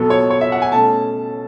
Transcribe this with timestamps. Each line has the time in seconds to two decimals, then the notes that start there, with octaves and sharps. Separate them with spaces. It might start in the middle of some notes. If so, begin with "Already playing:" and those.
Already playing: B2 F#3 B3 A4
0.10 C#5
0.30 C#5
0.41 E5
0.52 F#5
0.62 G#5
0.72 B2 A3 C#4 A5